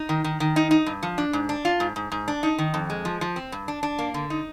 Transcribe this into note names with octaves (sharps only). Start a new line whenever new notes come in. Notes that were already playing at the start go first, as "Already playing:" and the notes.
Already playing: D#4
D#3
D#3
D#3
D#4
D#4
G2
F3
D4
G#2
D4
F4
G#2
G#2
G#2
D4
D#4
D#3
F2
G#3
F3
F3
C4
G2
D4
D4
A#3
D3
D#4